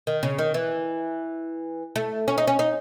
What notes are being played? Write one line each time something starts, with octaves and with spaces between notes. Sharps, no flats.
D#3
C#3
D#3
E3
A3
C#4
D#4
C#4
D#4